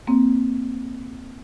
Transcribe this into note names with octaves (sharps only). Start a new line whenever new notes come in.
A#3 C4